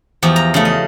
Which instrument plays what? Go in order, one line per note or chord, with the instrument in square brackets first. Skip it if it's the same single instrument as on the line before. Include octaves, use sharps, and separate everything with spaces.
[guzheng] E2 F3 G4
A#5
C#3 A3
D#5